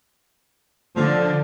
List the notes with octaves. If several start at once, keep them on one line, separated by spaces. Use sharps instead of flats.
D3 F3